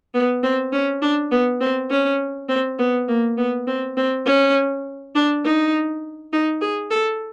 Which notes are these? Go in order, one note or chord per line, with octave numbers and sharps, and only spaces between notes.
B3
C4
C#4
D4
B3
C4
C#4
C4
B3
A#3
B3
C4
C4
C#4
D4
D#4
D#4
G#4
A4